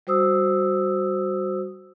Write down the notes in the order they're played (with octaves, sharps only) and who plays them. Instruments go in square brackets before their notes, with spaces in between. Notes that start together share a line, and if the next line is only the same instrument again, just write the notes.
[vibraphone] G3 F#4 C5 D#6 E6